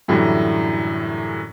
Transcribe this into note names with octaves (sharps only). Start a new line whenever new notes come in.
F#2 A2 D3 E3 F#3 G3